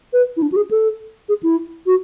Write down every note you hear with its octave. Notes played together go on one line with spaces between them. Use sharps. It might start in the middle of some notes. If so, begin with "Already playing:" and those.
B4
E4
D4
F#4
G#4
A4
G#4
E4
F#4